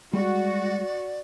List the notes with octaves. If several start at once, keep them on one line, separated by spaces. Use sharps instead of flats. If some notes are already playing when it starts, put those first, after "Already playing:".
G3 G#3 F#4 D5